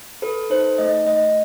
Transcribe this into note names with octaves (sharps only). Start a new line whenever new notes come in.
A4 B4
D#4 C5
A3 D#5
A3 D#5